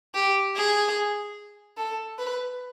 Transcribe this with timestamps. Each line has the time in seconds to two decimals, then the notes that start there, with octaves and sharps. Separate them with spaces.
0.14 G4
0.56 G#4
1.77 A4
2.18 B4